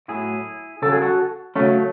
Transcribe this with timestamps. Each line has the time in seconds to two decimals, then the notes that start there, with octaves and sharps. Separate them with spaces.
0.08 A2 F#3 E4 G#4
0.82 C#3 F#3 A4
0.92 G#4
1.02 F#4 A4
1.55 C#3 F#3 A3 C#4